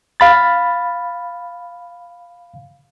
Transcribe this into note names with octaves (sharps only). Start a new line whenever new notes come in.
F5 B5 A6